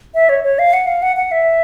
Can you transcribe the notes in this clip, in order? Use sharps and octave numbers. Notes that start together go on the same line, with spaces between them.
E5
C#5
C#5
F5
F#5
F5
F#5
F#5
E5